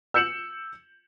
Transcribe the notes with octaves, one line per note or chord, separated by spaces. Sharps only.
E6 G6 C#7 E7 F#7